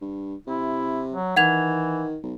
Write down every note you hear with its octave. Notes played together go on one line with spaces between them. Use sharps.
G2
C3 E4
F#3
D#3 E3 F#5 G#6 F7
B1